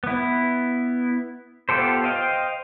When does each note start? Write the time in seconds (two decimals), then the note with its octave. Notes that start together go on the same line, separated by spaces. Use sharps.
0.04 B3 E4
1.69 B3 F4 G4 A4 C5
2.04 C5 D#5 F5 G5